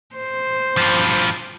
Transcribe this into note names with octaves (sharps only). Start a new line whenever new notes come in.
C5
G2 F3